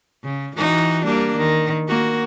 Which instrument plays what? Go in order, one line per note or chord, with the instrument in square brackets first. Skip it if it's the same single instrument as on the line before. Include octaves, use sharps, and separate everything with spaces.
[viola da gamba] C#3
E3 D#4 F#4
G3 A#3 D4
D#3
A#3 F#4